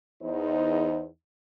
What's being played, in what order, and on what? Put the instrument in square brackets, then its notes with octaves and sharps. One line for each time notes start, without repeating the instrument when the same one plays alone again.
[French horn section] E2 D#4 C5